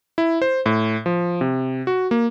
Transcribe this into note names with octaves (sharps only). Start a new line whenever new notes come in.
E4
C5
A2
F3
C3
F#4
A#3